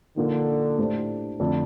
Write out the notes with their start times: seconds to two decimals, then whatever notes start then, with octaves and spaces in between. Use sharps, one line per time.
0.17 A#2 D3 F3 A#3 D#4
0.78 A2 A3 D4 G4 C5
1.40 F2 D3 A3 D4 A4